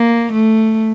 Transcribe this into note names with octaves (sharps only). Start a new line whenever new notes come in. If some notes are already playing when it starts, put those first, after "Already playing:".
Already playing: A#3
A3